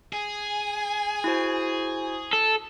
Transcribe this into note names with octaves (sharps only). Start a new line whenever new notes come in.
G#4 G#5
E4 F#4 C5
A4